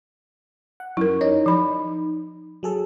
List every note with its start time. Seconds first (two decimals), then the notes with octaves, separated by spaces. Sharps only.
0.80 F#5
0.97 F#2 E4 A#4
1.21 D#4 C#5
1.46 F3 B5
2.63 F#3 G#4 A4